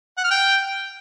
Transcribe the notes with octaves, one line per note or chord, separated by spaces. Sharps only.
F#5
F6
G5